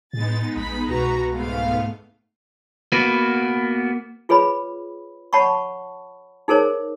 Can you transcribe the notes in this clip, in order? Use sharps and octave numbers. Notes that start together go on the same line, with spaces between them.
A2 G#3 B3 D#4 A6
A#1 B5
C2 B2 F#4 B4 A#5
G#2 G#3 A3 B3 F5
A#3 B3 F#4 B4
F4 G#4 B4 C#5 B5
C#5 F#5 A5 B5 C#6
D#4 G#4 A#4 C5 C#5